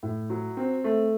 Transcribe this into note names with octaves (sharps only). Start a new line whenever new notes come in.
A2
F#3
C4
A3